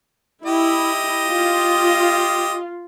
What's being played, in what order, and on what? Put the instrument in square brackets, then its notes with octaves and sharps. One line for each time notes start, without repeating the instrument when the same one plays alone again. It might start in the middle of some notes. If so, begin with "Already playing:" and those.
[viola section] E4 [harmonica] G4 D#5
[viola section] F4